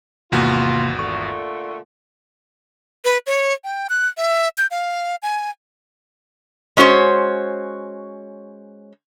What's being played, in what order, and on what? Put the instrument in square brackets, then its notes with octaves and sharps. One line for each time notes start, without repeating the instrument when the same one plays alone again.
[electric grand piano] G#1 E2 F#4 [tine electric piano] C3 A#3 [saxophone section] F4
[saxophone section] A#2 D3 A3 [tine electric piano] C#6
[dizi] B4
C#5
G5
F#6
E5
G6
F5
G#5
[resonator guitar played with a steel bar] G#3 C#4 F#4 C5 C#5